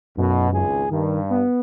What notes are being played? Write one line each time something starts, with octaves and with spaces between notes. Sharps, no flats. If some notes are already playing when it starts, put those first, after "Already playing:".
B1 F#2 B2
G#1 C#2 G#4
G2 D#3
B3